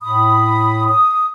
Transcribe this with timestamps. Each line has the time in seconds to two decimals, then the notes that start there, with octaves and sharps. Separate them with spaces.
0.02 A2 B5 D#6
0.89 D#6